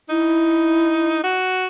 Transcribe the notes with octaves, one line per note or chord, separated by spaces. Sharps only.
D#4 E4
F#4